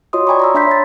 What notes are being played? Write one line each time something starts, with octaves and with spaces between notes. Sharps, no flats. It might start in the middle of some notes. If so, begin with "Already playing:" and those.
F4 F#4 C#5 D#5 C6 D#6
D5 G5 G#5 A#5 B5 C#6
A#5 B5 E6
D4 E5 G#5 C6 G6 B6
C#5 A6